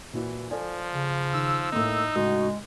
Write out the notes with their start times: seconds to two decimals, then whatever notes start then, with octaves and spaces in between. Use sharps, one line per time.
0.13 A#2 E3 E4 F#4
0.51 F3 A4 D5 G#5
0.92 C#3
1.33 D#3 E6
1.72 A2 A#3 D#4
2.16 A2 C#3 G#3 F#4